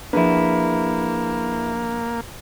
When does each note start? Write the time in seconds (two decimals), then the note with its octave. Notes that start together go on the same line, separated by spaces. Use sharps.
0.13 F3 A#3 D4 E4 G#4 B4